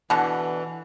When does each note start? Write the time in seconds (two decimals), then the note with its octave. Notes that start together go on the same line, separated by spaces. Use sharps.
0.10 B2 D3 E3